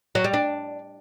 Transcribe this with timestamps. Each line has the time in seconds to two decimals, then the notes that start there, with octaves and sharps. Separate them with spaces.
0.15 F#3
0.24 G3
0.33 D4